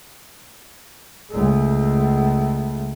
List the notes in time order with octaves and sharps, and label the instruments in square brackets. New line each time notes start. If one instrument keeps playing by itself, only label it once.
[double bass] C#2 A3